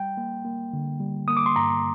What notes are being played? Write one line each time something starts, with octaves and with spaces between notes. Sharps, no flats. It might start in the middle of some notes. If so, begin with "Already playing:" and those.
Already playing: G3 G5
A#3
A#3
D3
G3
A#3 D#6
D6
C6
G2 A#5